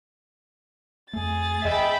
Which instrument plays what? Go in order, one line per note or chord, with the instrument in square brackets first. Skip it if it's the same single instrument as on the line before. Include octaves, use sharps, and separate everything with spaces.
[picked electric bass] F2 A3 [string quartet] G#4 A6
[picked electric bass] E2 [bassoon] G#3 [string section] E5 G5 B5